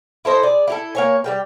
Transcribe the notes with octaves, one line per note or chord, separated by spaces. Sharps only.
E4 A4 C5 D#5
G#4 D5
E4 G4 A4
A#3 C#5 G#5
G3 A#3 G5